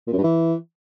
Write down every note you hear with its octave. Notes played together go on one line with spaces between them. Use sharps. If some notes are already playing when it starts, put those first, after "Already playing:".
A#2
F#2
G2
E3